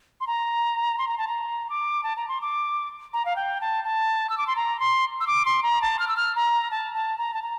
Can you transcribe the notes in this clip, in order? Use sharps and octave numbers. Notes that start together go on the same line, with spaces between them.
C6
A#5
C6
A#5
A5
A#5
D6
A5
A#5
C6
D6
A#5
F5
G5
A5
A5
E6
D6
C6
A#5
C6
E6
D6
C6
A#5
A5
F6
E6
F6
A#5
A5
A5
A#5
A5
A#5